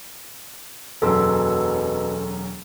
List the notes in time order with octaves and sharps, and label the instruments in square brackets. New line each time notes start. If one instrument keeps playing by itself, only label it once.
[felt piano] E1 F#2 [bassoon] B2 [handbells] A4 C6 E6